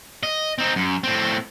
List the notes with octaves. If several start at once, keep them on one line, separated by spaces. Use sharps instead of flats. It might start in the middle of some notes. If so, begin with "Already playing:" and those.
D#5
C4 D#4
F#2
A2 C4